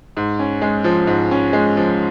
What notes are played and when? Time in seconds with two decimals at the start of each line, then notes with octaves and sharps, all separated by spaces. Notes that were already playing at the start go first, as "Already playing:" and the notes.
0.17 G#2
0.39 C#4
0.62 G#3
0.84 F3
1.07 G#2
1.31 C#4
1.53 G#3
1.77 F3